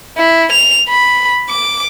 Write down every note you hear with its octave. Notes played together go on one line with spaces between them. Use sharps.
E4
F7
B5
D6